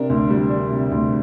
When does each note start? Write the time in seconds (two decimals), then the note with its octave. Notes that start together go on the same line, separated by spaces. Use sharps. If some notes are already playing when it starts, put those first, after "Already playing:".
Already playing: C3 D4 A#4
0.10 D2
0.30 G3
0.50 D4
0.70 C3
0.91 D2